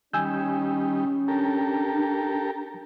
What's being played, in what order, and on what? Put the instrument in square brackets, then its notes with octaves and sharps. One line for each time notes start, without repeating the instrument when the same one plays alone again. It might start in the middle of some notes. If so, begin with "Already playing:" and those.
[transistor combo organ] D#3 G3 [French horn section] C#4 [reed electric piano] G#5 E6 G6
[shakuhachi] D4 [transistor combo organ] G4 A4 A#4